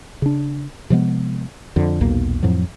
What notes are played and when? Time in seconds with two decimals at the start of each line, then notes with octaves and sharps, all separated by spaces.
0.22 C#3 D4
0.90 C3 F3 G#3 B3
1.76 F2 D3
2.01 B1 E2 A#2 A#3
2.43 F2 A2 F3 F#3